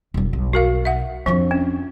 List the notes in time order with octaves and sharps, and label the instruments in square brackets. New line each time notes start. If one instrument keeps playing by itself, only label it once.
[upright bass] E1 F#3
B1
[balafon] F#4 A#4 F5
E5 F#5
[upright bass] F2 D4 [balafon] F3 C#6
[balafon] C#4